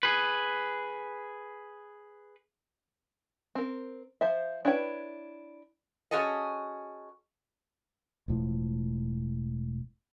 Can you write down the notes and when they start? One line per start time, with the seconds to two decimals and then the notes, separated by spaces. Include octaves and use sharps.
0.03 G#4 B4
3.55 C4 A#4
4.21 F3 C5 E5
4.65 D4 E4 B4 C#5 G5
6.11 C#4 F#4 G#4 A4 D#5
8.28 E1 A2 F3